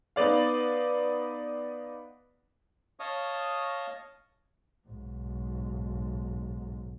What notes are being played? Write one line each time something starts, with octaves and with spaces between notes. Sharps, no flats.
B3 D#4 B4 D5 F5
C#5 D#5 F5 A5 C#6 D#6
B1 G#2